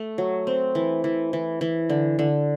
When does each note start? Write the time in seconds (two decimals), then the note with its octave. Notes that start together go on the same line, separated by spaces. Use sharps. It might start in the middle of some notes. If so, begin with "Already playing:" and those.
Already playing: A3
0.18 F#3
0.47 C4
0.75 E3
1.04 E3
1.33 E3
1.61 E3
1.89 D3
2.19 D3